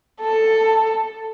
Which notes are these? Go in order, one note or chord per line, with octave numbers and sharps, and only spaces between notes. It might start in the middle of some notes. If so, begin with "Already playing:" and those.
A4